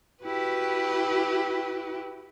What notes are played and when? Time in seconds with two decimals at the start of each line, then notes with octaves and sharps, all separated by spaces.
0.24 E4 F#4 G4 B4